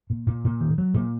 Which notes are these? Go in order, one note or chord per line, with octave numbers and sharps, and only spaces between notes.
A#2
A#2
A#2
D#3
F#3
A#2